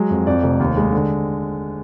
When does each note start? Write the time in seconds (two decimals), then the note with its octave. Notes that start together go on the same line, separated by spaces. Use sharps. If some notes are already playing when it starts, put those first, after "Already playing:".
Already playing: F#3 G#3
0.10 F2
0.27 F2 D5
0.43 F1
0.60 D#2
0.77 G#3
0.92 D3